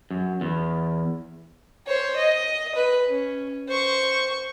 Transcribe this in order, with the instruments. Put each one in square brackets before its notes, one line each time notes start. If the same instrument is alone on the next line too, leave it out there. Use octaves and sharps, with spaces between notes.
[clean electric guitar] F#2
E2
[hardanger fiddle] C5 C#5
D#5
B4
C#4
C5 C#6